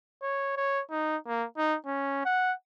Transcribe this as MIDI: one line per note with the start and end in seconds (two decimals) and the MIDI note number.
0.22 0.55 73
0.57 0.82 73
0.90 1.17 63
1.27 1.45 58
1.57 1.76 63
1.86 2.22 61
2.25 2.53 78